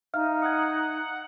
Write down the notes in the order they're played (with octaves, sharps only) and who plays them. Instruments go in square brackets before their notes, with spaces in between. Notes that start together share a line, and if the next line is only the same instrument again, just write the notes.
[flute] D#4 [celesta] E5 F5 F6
[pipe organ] F#5 [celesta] D#6 G#6